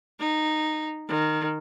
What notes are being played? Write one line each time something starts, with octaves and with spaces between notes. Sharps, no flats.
D#4
D#3